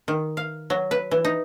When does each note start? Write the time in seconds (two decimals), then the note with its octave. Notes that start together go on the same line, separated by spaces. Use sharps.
0.08 D#3
0.37 F5
0.70 F#3
0.91 B4
1.11 E3
1.25 D#4